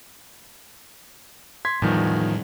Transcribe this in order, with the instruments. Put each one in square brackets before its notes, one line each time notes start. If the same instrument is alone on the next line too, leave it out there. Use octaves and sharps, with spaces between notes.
[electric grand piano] C6 G#6 B6
[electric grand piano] E2 D#3 F3 [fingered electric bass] A2 G3